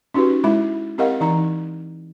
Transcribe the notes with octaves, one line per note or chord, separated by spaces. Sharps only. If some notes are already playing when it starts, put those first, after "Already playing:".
C#4 D#4 F#4 G4 B4
G#3 E4 E5 B5
C4 G4 A#4 D#5 F5 F#5
E3 D#4 A#5